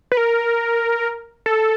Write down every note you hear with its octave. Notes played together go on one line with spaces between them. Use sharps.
B4
A#4
A4